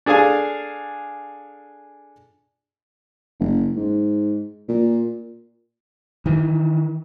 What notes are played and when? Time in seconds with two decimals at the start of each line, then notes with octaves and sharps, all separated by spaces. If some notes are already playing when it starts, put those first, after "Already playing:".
0.06 D4 G#4 A4 F5 G#5
3.40 F#1
3.76 G#2
4.69 A#2
6.26 D#3 E3